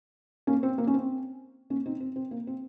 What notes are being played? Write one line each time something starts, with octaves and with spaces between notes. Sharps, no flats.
A#3 C#4
C4
A#3
C#4
C4
A#3 C#4
C4 D#4
C4
C4
A#3
C4